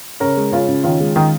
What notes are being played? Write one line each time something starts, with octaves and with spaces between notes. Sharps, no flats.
C#3 A#4 C#5
G#3
C#3 C#4 F4
C#3
D#3 C#4 F4
G#3
D#3